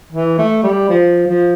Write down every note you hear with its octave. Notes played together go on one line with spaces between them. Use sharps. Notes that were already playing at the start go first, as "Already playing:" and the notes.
E3
A3
G3
F3
F3